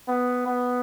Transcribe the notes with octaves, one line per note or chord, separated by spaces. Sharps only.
B3
B3